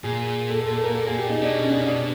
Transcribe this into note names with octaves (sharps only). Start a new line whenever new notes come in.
A#2 G#4
A4
A4
A4
A#4
A4
G#4
G4
D#4
B2 D4
C#4
D4
C#4
D4